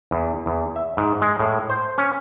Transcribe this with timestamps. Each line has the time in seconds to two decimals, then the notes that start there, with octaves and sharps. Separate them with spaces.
0.11 E2
0.46 E2
0.76 E5
0.97 G#2
1.22 G#3
1.39 A2
1.70 C5
1.98 C#4